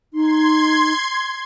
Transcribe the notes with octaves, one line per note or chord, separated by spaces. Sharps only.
D#4 C6 G#6